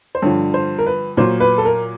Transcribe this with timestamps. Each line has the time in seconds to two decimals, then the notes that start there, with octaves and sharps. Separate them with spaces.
0.15 C5
0.22 G2 D3 F3 C#5
0.54 C5
0.79 A#4
0.86 B4
1.17 A#2 F#3 C5
1.40 B4
1.58 A4
1.65 A#4